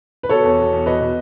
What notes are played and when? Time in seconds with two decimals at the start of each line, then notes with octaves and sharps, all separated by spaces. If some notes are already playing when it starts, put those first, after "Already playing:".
0.23 B4
0.29 B2 A4 C#5
0.44 E2
0.59 B2
0.73 E2
0.86 B2 B4 D#5
1.01 B2